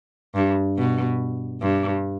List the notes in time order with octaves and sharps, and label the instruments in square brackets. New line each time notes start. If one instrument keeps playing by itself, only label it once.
[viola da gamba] G2
B2
G2